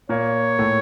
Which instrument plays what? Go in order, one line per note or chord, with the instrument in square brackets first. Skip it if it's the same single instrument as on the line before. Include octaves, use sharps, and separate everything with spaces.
[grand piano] A#2 A#3 [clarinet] C#5
[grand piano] A2 A3